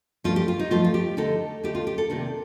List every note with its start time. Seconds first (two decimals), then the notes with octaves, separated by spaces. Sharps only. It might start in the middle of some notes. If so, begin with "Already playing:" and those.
0.24 G2 F3 A3 F4
0.36 G4
0.48 F4
0.60 D#4
0.71 G2 F3 A3 F4
0.84 F4
0.94 G4
1.17 D3 A3 D#4 A4
1.63 D3 A3 D#4 G4
1.75 F4
1.87 G4
1.98 A4
2.10 C3 D#3 A#3 D4 A4